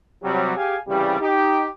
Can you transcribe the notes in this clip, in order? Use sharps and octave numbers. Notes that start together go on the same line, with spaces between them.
C3 F#3 G3
G4 G#4 F5 G#5
C2 C#3 E3 G3
D#4 G4